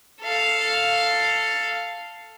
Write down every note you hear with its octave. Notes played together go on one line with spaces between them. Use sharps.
A4 F5